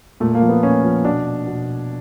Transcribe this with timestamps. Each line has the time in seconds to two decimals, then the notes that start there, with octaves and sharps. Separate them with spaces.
0.20 A#2 A3
0.35 A#3
0.42 F3
0.49 B3
0.63 A#2 C#4
0.83 F3
1.04 B2 D4
1.47 B2